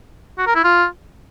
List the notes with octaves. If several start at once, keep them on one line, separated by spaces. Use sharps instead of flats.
F#4
A#4
E4
F4